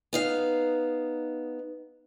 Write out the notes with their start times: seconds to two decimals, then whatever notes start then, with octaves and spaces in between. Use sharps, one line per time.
0.13 B3 D#4 F5